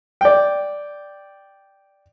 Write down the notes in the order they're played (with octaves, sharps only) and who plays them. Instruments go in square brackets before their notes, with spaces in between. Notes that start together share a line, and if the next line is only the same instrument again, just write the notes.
[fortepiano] D5 G5